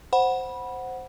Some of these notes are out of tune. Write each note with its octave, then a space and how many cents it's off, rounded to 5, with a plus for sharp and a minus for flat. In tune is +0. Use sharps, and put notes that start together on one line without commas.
C5 +0 F#5 +0 B5 -15